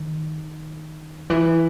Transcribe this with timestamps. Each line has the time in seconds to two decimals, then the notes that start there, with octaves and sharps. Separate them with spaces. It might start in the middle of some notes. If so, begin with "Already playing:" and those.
Already playing: D#3
1.30 E3